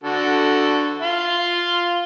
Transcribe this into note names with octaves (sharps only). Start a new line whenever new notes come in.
D3 F#4 A4
F4 F5 C6